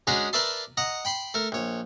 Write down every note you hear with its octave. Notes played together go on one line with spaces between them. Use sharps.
G#3 C#4 D4 F#4 G#4 A#5
A#4 B4 D5 E5 A5 C6
D#5 F#5 A#5
G5 B5 C6
A3 A#4
A#1 C#5